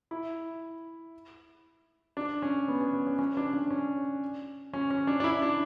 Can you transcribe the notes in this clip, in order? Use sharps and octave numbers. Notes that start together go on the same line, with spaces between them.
E4
D4
C#4
B3
C#4
B3
C#4
C#4
D4
C#4
D4
C#4
C#4
C#4
D4
D4
E4
D4